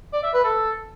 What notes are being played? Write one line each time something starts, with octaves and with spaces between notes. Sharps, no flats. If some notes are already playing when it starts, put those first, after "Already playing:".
D5
E5
B4
A4